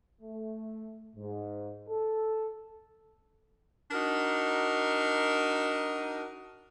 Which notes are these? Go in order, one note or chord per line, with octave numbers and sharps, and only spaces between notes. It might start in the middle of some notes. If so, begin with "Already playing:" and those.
A3
G#2
A4
D4 D#4 F#4 A#4